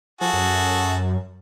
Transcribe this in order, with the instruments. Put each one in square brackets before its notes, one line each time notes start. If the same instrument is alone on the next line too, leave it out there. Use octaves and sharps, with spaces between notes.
[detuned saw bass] F3 [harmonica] F#4 G#4 A4
[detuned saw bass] F#2